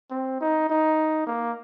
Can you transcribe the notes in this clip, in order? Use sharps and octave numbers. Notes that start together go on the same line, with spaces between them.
C4
D#4
D#4
A#3